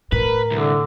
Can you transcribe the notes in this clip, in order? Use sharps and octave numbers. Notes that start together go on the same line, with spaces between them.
A2 A#4 B4
C2 D3